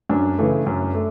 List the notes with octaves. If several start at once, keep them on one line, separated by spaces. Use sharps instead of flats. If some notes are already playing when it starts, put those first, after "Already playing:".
F#2 D4
C#3 E3 A3
F#2
A3